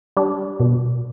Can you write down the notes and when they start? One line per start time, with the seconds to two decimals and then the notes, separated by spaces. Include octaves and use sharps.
0.17 G3 D4
0.60 B2